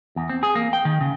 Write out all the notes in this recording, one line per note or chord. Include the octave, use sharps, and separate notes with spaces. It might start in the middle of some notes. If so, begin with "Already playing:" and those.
E2
C4
G#4
A#3
G5
D#3
C#3